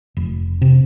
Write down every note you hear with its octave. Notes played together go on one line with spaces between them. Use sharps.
F1
C3